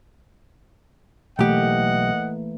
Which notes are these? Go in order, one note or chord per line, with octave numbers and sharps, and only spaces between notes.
B1 E3 A3 A#3 G4 D#5 F#5